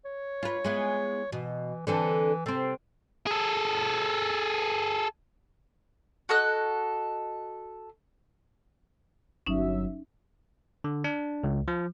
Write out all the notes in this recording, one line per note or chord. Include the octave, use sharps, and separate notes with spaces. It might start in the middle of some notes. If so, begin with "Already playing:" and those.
C#5
F4 B4
G#3 B3 E4
B2 E3
D3 E3 C4 A4
C3 C4 A4
G#4 A4
F#4 A4 D#5 F#6
G1 F#3 C#4 D#4 E5
D3
D4
C#2
F3